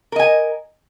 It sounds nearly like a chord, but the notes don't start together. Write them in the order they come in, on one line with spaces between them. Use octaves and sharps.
A#4 D#5 G#5